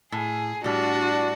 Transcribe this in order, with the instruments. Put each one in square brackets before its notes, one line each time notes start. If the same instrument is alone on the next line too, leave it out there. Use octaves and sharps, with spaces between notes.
[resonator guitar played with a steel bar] A2 [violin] G#4
[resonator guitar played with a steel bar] A2 G3 [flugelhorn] D4 [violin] F#4